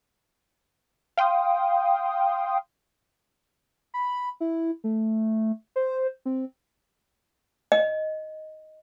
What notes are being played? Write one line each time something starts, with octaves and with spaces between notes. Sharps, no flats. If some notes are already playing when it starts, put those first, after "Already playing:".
F5 G5 C6 D#6
B5
E4
A3
C5
C4
D#5